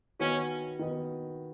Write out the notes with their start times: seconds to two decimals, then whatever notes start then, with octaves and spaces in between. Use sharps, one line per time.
0.20 D#3 B3 C#4 F#4
0.79 D#3 B3 F#4